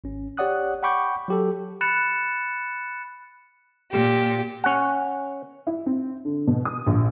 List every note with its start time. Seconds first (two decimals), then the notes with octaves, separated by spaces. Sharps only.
0.04 G#1 C#4
0.37 G4 C#5 D5 F#5 D#6 F#6
0.83 F#5 G5 B5 C#6 D6 G6
1.28 F#3 G4 A4
1.81 B5 F#6 A6 C#7 E7
3.91 A#2 G4
4.64 C#4 F#5
5.67 E4
5.86 C4
6.25 D3
6.47 B2
6.65 D#6
6.87 A#1